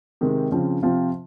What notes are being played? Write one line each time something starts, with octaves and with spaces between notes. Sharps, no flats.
C3 D#3 G#3 C4
C#3 F3 C4
C3 F3 C4 F4